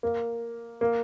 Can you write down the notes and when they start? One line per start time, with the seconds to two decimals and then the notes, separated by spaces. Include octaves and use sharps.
0.03 A#3
0.81 A#3